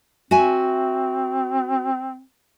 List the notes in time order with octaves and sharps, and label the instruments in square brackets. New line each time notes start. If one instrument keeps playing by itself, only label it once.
[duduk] C4 [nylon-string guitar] F#4 E5 G#5